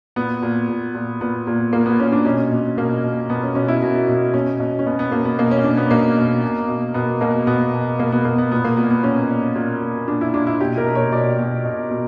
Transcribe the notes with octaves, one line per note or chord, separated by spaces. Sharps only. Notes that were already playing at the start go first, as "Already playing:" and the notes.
A#2 B3
A#2
A#2
A#2
A#2 B3
A#2
A#2 A#3
B3
A#2 C#4
D4
B2 C#4
B2
B2 A#3
B2
B2 B3
C#4
B2 C#4
E4
B2 F#4
B2
B2 C#4
B2
C#4
B2 B3
B3
B2 A#3
B3
B2 A#3
C#4
B2 D4
B3
B2 A#3
B2
B2
B2
B2 B3
B2 A#3
B2 B3
B2
B2 A#3
B3
B2 A#3
B3
A#2 B3
A#3
A#2 B3
B3
A#2 C#4
A#2
A#2
A#2
A#2 D4
E4
A#2 D4
E4
B2 G4
A#4
B2
C#5
B2 D5
B2
B2
B2